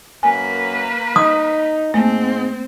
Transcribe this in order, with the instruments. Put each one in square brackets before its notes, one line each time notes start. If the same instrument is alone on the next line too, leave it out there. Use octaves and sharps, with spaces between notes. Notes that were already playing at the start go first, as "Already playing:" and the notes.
[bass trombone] F#2 [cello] A#3 B4 [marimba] G#5
[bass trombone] D#4 [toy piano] D#6
[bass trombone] G#2 [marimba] A3 A#3 [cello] C4